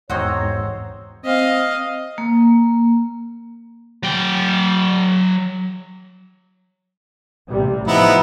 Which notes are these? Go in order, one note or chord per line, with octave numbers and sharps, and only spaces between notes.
E2 G#2 C4 F#4 C5 C#5 D#5 A#5
C4 D#5 F5
A#3
F#3 G5
A1 C3 G3
F3 B3 D#4 E4